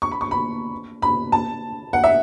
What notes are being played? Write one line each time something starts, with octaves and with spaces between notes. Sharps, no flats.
C#6
B5
C#6
B5
B5
A5
F#5
E5